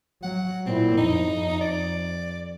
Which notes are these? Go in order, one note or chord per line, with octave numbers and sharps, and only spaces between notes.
F#3 F#5
A#2 C4 E4
F2 D#4
F2
D5